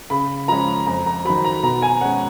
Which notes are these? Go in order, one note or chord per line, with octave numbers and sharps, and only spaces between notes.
C#3 B5
F3 G#3 C#4 A#5
F2 A#5
A#5
D#3 F#3 B5
A#5
B2 A#5
G#5
G#3 C#4 F#5